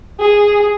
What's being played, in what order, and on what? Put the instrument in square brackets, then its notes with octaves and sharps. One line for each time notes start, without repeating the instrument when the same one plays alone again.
[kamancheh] G#4